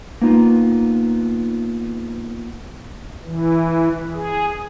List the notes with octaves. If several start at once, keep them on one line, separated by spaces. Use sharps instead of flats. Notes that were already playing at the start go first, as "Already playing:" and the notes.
A#3 B3 D#4 F4
E3
G#4